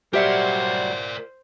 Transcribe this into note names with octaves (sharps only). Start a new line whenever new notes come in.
F#3 G3 G4 A#4 C5 D5 E5 F#5